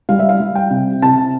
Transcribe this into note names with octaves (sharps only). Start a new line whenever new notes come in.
G3 F5
E5
F5
G3
G5
C3
C3 A5